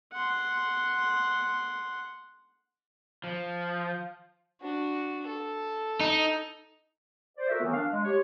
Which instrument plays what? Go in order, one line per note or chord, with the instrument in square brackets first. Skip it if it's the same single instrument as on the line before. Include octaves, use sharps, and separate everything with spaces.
[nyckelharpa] F#5 C6
[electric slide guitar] F3
[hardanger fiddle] D4 F#4
A4
[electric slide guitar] D#4
[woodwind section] C5 D5
F4 F#4 A4 A#4 E5
D#3 E3 F#3 A3 B3
D4 F5
G#3
G4 C#5